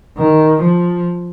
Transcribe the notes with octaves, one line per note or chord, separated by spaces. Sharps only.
D#3
F3